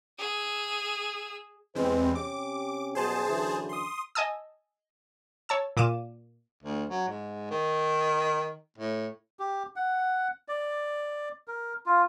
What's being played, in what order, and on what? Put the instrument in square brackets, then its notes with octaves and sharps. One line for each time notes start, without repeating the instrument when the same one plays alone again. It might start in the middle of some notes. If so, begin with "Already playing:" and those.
[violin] G#4 E6
[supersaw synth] E2 C4 [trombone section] C3 G#3 B4
[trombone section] C3 C#4 G4 [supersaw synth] D6
[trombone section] F#2 B2 G3 [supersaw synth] G#4 C5 A5
[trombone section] F#2 D3 E3
[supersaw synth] C6 D#6
[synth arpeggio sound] D#5 G#5 A5 D#6 E6
C#5 A5 E6
A#2 D6 D#7 E7
[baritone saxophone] D2
F#3
G#2
D#3
A2
[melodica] G4
F#5
D5
A#4
F4